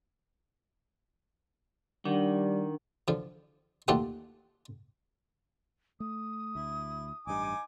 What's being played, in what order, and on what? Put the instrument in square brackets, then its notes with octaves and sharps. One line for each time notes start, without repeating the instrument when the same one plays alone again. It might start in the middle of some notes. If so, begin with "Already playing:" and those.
[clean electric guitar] D#3 [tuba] G3 [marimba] D4 F#5
[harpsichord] D3 F3
D#2 A3 F4 G4 A4 F#5
[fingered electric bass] A3 [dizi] D#6
[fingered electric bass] D2 [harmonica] E4
[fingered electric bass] A1 G2 [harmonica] D#4 G#5 D6